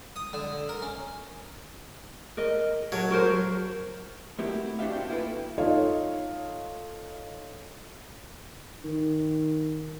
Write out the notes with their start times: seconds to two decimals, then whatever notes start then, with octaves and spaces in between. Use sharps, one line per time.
0.16 D#6
0.33 D3
0.69 A#4
0.82 C#4
2.37 A#4 D#5
2.92 F#3 A4 A#4 C#5
3.11 F#4 A#4 C5
4.39 A3 C4 E4 F#4 G4 A#4
4.79 D4 F#4 G4 E5 F5
4.93 F#4 C5 G5
5.08 A#3 B3 E4 F4 A4 B4
5.58 D#4 F4 A4 C#5 D#5 F5
8.84 D#3